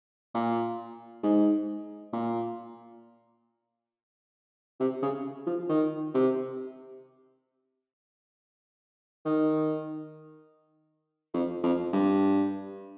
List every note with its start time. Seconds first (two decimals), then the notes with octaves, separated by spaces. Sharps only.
0.34 A#2
1.23 G#2
2.13 A#2
4.80 C3
5.02 C#3
5.47 F3
5.69 D#3
6.14 C3
9.26 D#3
11.34 F2
11.63 F2
11.93 G2